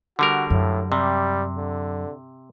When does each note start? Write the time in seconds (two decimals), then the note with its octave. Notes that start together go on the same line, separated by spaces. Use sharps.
0.19 D3 G3 F#4 A#4
0.50 F#2 A2
0.92 C3 G3
1.57 D3